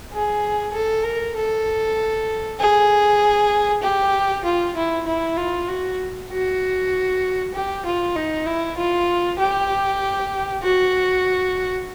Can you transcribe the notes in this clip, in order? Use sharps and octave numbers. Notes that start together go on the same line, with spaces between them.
G#4
A4
A#4
A4
G#4
G4
F4
E4
E4
F4
F#4
F#4
G4
F4
D#4
E4
F4
G4
F#4